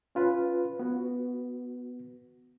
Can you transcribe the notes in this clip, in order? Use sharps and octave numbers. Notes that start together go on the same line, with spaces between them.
C#4 F4 B4
B3 F#4